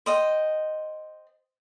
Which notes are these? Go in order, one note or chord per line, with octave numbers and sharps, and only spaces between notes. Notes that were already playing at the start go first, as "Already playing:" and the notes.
C5 D#5 G5